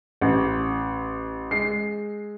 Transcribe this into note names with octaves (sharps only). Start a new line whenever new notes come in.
A1
G#3 C7